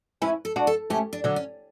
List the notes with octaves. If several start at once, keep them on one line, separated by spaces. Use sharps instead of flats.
C#4 E4 B4
A4
D4 F#4
A4
A3 C#4 G4
D4
D3 F#3
C#4